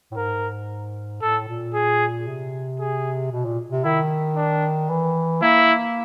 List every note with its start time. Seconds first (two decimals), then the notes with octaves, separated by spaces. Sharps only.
0.11 A2
0.17 G#2 A#4
1.22 A2 A4
1.48 A#2
1.74 G#4
2.27 C3
2.80 G#4
3.32 B2
3.45 A#2
3.71 C3
3.84 D#3 E4
4.36 D4
4.90 E3
5.42 A#3 E4